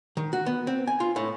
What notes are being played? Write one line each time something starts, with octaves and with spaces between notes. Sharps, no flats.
D#3
F#4
B3
C4
G#5
F4
A2